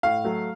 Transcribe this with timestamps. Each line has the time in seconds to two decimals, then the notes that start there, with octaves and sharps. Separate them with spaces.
0.03 A2 F5
0.24 F#3 A3